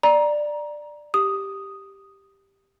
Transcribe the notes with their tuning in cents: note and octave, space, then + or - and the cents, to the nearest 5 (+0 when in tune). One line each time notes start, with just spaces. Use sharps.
D5 +10 A#5 +20
G4 +0 D#6 +0